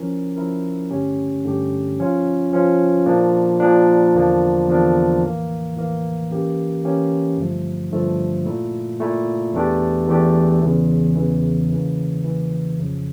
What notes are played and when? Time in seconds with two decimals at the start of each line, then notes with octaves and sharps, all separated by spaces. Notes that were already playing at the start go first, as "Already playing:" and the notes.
Already playing: F3 C#4 E4 A#4
0.36 F3 C#4 E4 A#4
0.90 G2 D3 A3 C#4 G4
1.44 G2 D3 A3 C#4 G4
1.98 F3 C#4 F4
2.53 F3 C#4 F4
3.06 A#2 F3 A#3 D4
3.60 A#2 F3 A#3 D4
4.14 E2 D3 F3 A#3 D4
4.68 E2 D3 F3 A#3 D4
5.22 A2 E3 A#3
5.76 A2 E3 A#3
6.30 E3 A#3 C#4 G4 A#4
6.84 E3 A#3 C#4 G4 A#4
7.38 G2 D3 F3 A3
7.92 G2 D3 F3 A3
8.46 A#2 A3 E4
9.00 A#2 A3 E4
9.53 E2 E3 A3 D4 G4
10.07 E2 E3 A3 D4 G4
10.61 E2 C#3 E3
11.15 E2 C#3 E3
11.69 C#3 E3 A#3
12.23 C#3 E3 A#3
12.77 F2 C#3 F3